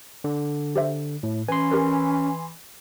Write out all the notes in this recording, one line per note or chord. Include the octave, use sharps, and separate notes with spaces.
D3
G4 C5 E5
A2
E3 C#4 B4 G#5 C6
G4 A#4 B4